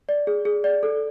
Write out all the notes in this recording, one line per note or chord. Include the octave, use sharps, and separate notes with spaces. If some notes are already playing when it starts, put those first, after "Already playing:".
D5
G#4
G#4
D5
A4